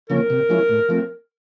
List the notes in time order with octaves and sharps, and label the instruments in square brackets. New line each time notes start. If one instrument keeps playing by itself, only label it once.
[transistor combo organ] C#3 F3 A#3 C#4 [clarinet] A#4
[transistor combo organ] C3
F3 G#3 C#4 E4
A2
F3 A3 C4